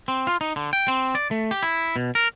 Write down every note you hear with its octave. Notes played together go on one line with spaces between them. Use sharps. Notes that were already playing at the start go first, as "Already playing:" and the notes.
C4
F4
D#4
D3
G5
C4
D5
A3
G4
E4
B2
A#4